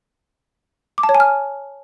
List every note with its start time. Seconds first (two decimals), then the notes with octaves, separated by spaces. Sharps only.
0.98 D6
1.03 A5
1.09 C#5
1.15 G#5
1.20 F6